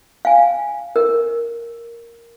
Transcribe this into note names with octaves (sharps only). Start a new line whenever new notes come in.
F5 G#5
A#4